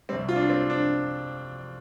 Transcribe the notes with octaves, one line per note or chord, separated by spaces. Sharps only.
C2 C3 G3 C4
F4
D4
C4
D4